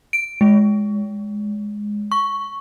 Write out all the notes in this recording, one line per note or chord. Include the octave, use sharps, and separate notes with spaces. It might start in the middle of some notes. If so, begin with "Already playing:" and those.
D7
G#3
C#6